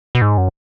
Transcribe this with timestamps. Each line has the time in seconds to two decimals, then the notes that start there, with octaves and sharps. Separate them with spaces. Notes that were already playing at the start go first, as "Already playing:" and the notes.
0.15 B2
0.22 G#2
0.38 F#2